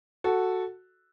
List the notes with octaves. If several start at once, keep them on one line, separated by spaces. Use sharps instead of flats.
F#4 A4